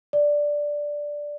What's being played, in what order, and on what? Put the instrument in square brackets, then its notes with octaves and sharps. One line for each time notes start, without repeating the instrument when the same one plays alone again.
[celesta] D5